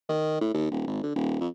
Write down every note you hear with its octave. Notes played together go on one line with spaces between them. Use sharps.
D#3
A2
D#2
D#1
G#1
D3
D#1
F2